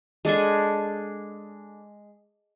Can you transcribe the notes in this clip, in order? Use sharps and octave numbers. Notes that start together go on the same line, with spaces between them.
G#3 D4 A4 G#5